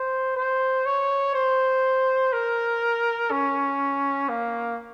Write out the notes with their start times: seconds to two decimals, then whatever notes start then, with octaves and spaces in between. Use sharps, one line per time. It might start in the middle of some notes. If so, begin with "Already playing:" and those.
Already playing: C5
0.37 C5
0.86 C#5
1.35 C5
2.33 A#4
3.31 C#4
4.29 A#3